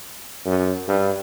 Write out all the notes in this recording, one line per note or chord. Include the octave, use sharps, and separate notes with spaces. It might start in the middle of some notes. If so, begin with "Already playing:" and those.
F#2
G2